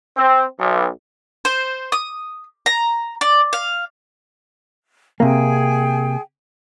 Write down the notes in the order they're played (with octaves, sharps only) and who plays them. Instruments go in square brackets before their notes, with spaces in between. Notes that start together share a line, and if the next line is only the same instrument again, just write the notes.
[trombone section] C4
B1
[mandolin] C5
D#6
A#5
D5
F5
[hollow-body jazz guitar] C3 A#3 [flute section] G#4 G5 G#5